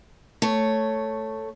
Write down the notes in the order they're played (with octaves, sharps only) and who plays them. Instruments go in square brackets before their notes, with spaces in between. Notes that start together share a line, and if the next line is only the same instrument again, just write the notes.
[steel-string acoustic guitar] A3 C#5